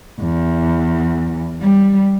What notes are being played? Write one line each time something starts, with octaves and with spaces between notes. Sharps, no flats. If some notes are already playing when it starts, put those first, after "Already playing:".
E2
G3